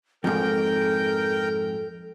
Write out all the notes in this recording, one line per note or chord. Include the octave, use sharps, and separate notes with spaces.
F2 G#2 A4 A#4 G5 G6